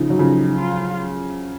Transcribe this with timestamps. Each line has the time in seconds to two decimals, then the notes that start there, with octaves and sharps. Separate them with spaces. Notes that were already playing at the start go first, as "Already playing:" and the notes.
Already playing: C#3 F3 D#4
0.10 F#3
0.19 C#3 F3
0.59 F4